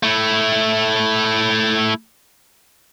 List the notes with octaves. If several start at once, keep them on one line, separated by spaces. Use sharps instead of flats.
A3 E4